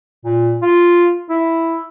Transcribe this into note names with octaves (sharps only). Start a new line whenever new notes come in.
A#2
F4
E4